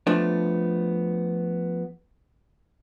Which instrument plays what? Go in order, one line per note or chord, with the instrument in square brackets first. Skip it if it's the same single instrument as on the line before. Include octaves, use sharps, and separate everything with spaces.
[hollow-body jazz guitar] F3 A3 B3 D4